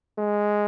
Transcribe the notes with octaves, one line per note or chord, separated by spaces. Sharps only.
G#3